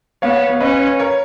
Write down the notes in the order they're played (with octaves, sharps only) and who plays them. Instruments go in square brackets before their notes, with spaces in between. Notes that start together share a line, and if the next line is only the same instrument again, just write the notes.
[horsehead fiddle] B3 [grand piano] C#5 F5
[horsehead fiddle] C#4 [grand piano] B4 D#5
[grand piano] A#4 C#5